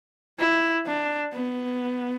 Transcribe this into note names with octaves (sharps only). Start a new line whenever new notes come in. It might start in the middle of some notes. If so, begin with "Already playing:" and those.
E4
D4
B3